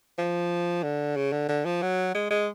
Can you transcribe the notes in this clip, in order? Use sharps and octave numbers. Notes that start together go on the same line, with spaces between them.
F3
D3
C#3
D3
D3
F3
F#3
G#3
G#3